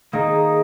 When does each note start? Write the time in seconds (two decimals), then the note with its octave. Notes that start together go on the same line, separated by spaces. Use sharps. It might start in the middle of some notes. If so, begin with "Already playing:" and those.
0.13 D#3 A#3 D#4 G#4